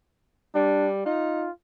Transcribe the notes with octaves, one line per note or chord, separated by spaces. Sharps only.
G3 D4
D#4 F4